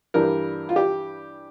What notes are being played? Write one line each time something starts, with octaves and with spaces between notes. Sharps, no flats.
G2 E3 G3 A#4
F4
G4